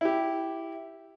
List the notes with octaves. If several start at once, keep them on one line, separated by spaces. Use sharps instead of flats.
E4 G4